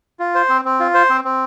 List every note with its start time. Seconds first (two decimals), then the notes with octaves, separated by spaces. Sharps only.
0.19 F4
0.35 C5
0.49 C4
0.65 C4
0.80 F4
0.94 C5
1.10 C4
1.24 C4